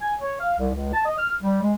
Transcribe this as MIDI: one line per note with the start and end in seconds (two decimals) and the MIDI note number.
0.01 0.14 80
0.21 0.38 73
0.40 0.54 77
0.59 0.71 36
0.75 0.91 37
0.94 1.02 81
1.05 1.17 75
1.18 1.33 89
1.42 1.60 55
1.62 1.74 56